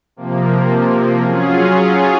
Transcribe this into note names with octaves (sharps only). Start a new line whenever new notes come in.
C3 F3 A#3
F#3 C#4 F4 G#4